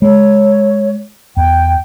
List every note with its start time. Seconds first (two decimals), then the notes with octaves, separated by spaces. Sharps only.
0.02 G#3 C#5
1.37 E2 G5